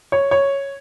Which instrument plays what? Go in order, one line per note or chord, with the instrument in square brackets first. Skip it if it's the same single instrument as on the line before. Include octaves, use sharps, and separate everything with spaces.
[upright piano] C#5
C#5